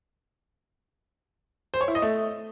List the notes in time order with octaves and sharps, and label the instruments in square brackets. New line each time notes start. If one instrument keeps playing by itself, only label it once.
[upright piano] C5
C#5
E4
D#5
A3